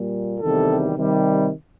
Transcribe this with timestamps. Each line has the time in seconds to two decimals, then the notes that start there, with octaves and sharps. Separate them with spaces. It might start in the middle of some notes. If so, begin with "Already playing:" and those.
Already playing: A#2 G3 A#3
0.39 E2 C3 D#3 G3 A4
0.95 C3 D#3 G3